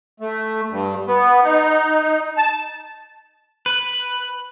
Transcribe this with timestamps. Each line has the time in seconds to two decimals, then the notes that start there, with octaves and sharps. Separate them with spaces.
0.20 A3
0.70 G2
1.07 B3
1.44 D#4
2.37 A5
3.66 B4